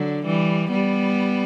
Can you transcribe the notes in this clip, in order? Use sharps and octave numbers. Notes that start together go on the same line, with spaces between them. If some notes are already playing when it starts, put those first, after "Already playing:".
Already playing: D3 F#3
E3 G3
G3 B3